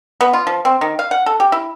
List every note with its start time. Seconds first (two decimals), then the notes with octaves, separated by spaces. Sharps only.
0.21 B3
0.33 F4
0.47 F3
0.65 C4
0.81 D#3
0.99 F5
1.11 F#5
1.26 A4
1.40 G4
1.52 E4